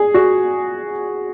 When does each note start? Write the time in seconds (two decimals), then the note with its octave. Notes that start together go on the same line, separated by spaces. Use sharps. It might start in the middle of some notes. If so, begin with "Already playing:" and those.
Already playing: G#4
0.14 F#4